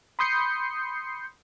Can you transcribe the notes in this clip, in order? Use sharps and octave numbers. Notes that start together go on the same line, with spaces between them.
B5 C6 D#6 G6 C7 C#7